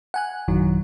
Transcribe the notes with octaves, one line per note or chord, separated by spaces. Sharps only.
F#5 G#5 F#6
A1 F#2 D#3 F#3